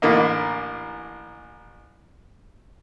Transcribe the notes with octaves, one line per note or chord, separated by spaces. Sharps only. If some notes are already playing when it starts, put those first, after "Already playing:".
A1 D3 A#3 D#4